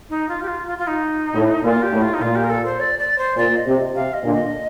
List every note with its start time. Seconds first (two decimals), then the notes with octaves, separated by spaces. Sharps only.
0.09 D#4
0.28 F4
0.42 G4
0.47 F4
0.67 F4
0.78 F4
0.87 D#4
1.34 A2
1.63 A#2 F4
1.82 G4
1.92 A2
2.01 F4
2.14 D#4
2.21 A#2 F4
2.35 G4
2.44 A#4
2.49 A4
2.64 C5
2.79 D5
2.99 D5
3.18 C5
3.37 A#2 D5
3.56 D#5
3.66 C3
3.94 C3 F5
4.13 D#5
4.24 A#2 D3
4.33 D#5